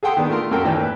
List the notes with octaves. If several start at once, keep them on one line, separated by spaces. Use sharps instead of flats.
G#4 A4 F#5 G5 C6 D#6
D#3 B3 D4
A3 F4 A#4 A#5 C6
F#2 A#3 F#4 A4 A#4 G5
D#2 A2 E3 D5 G5
B4